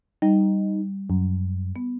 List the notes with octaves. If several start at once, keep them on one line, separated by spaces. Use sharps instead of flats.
G3 D#4
F#2
B3